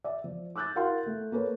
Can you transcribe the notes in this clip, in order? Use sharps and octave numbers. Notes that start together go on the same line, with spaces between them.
D5 E5
F3
D6 E6 F#6 G6 A6
E4 F#4 A#4 F5 F#5 C6
A3
A#3 A4 B4 C#5